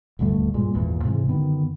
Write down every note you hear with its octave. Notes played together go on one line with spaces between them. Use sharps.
D#1 D2 G2 A3
G2 A#2 G#3
G#1 E2 A#2
G#2 C3 E3 G#3
F#2 D3 D#3 B3